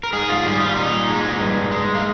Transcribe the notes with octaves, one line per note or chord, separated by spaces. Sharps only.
A#4
G#2 G#4
F4
G3 G#4
F4
A#2 D#4
G#3
G2
G#3
A#3